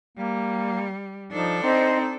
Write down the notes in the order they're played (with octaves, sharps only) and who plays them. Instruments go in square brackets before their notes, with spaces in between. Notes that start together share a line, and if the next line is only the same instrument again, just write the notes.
[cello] G3 [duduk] A#3
[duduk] F3 [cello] D4 A4 [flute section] D#4
[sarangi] C4 [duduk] D#4 [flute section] C5 D#5